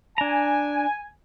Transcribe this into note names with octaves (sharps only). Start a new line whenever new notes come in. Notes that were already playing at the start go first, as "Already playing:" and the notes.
D4 G#5 A#5